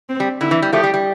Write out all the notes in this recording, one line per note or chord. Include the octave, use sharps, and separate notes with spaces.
C4
G3
D3 E4
E3
G3
F3 A3 G4
G3
G3